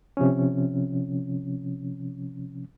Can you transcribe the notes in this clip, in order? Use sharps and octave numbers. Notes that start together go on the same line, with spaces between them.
C3 F3 C#4